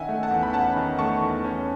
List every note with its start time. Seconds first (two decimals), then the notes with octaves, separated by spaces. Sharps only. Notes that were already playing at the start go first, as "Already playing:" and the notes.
Already playing: D#3 C#4 D#5 E5 F#5 G#5
0.08 A3
0.23 F#5 A5
0.31 E2
0.43 B5
0.53 C#4 F#5 A5
0.76 D#3
0.99 A3 A5 C#6
1.21 E2
1.44 C#4